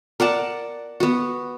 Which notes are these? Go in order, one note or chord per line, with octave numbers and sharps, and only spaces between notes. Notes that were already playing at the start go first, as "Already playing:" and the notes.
A#4 D5 F#5 A5
B3 F#4